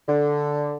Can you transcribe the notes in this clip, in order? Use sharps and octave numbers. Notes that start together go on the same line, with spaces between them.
D3